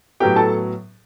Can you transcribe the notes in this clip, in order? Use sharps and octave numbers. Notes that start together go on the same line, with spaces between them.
A2 F#3 B3 G4 G5
A4 A5